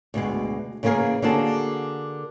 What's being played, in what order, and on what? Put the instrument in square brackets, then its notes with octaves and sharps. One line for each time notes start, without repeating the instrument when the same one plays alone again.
[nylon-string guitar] D2 B2 G#3
C#3 E3 A#3 C4 G#4 A#4
D3 A#3 F#4 G#4 A5